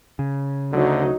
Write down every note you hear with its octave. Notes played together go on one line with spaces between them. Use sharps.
C#3
D2 D3 F#3 D#4